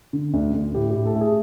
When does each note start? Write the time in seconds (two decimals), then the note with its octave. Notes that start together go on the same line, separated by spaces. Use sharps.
0.13 D3
0.34 D2
0.54 D2
0.74 A2 G4
0.90 A2 G4
1.06 A4
1.15 A3
1.21 G#4